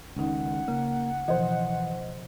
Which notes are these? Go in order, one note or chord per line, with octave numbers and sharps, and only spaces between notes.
C#2 D#3 C#4 D#4 F#5
C#3 A#3
B2 E3 F3 C5 D#5